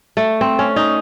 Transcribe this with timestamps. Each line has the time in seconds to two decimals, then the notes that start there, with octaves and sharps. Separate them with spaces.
0.17 A3
0.41 C4
0.59 C#4
0.76 D#4